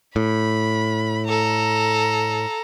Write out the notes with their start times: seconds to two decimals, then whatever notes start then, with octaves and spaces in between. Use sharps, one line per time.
0.16 A2 B5
1.26 A4 A#5